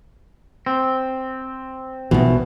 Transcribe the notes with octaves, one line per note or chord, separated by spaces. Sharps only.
C4
B1 E2 B2 D#3 F3